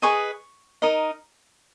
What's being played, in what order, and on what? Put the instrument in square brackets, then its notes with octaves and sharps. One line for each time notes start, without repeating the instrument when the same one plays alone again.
[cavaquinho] G#4 B4 D#5 C#6
D#4 A#4 D#5